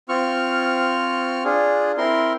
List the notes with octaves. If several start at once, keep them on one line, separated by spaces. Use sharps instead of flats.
C4 F4 C#6 F6
D4 F4 G#4
C4 E4 A#4 C6